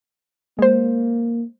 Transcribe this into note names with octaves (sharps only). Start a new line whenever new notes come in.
G#3 A#3 C5